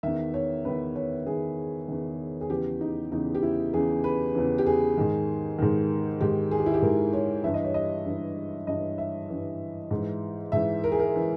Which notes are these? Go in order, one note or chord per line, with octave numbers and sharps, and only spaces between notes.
E2 D#3 E5
C#5
E2 D#3 B4
C#5
E2 D#3 G#4
E2 D#3
G#4
E2 C#3 E3 G4
D#4
E2 C#3 E3 D#4
G4
E4
E2 C#3 E3 G#4
B4
E2 C#3 E3
G4
G#4
G#2 D#3
G#2 D#3
G#2 D#3 G4
G#4
G4
E4
G4
G#2 D#3 A#4
C#5
G2 E3 E5
D#5
C#5
D#5
G2 E3
G2 E3 D#5
E5
G2 E3
G#2
E3
G#2 E3 E5
A#4
G#4
A#4
E3